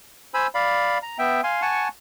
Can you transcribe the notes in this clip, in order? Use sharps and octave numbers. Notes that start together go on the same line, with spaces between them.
C5 G#5 B5 E6
D5 F5 B5
A#5
B3 E5 G5
F5 G#5 C6
F#5 G#5 A5 C#6